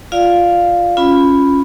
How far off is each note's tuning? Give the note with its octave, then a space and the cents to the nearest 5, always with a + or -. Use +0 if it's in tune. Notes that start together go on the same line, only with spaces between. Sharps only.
F4 +0 D5 +0 F5 +0
C#4 +0 F4 +0 B5 +0